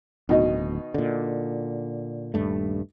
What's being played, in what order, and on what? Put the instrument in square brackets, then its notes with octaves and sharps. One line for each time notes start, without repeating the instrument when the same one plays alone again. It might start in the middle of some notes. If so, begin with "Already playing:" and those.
[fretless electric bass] D1 D2 [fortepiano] B2 D#3 D#4
[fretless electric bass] A#2 D3
D#1 G2 A3